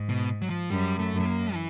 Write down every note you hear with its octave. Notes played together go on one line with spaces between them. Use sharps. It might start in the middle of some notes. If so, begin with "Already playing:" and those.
Already playing: G#2
B2
F#3
F3
F#2 G3
A3
F#2
A3
A#3
E3